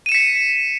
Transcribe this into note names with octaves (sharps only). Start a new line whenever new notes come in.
B6 C#7 D#7 E7